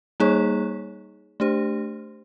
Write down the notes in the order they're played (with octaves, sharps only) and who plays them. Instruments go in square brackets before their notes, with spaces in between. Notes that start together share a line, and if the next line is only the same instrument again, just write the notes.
[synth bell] G3 A#3 D#4 G#4 C#5
A3 D4 G4 C5